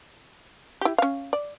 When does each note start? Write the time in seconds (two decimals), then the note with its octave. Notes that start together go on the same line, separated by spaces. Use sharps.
0.81 E4 G4
0.98 C#4 F5
1.33 D5